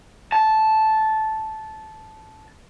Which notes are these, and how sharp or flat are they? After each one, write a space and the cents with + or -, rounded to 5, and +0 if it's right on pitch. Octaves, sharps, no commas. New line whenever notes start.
A5 -10